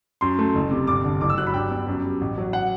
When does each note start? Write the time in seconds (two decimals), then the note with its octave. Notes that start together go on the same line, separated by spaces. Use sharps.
0.21 F#2 C6
0.39 A3
0.55 F#1
0.71 C3
0.87 G1 D6
1.04 D3
1.21 F#1 D6
1.30 E6
1.38 F#3 F#6
1.47 B5
1.54 G2 G5
1.71 B3
1.88 F#2
2.04 G3
2.21 A1
2.38 F#3
2.53 F#5